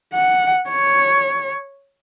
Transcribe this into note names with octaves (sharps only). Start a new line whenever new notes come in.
F#5
C#5